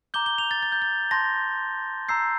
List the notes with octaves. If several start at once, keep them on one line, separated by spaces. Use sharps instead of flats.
A#5 D6 G6 G7
G7
F7
A6
A6
G6
A6
A5 C6 G6 A#6
A#5 E6 G6 C7